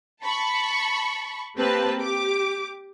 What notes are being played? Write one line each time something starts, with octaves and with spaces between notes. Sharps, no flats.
A5 B5 C#6
A#3 C4 G4 B4 A5
G4 D6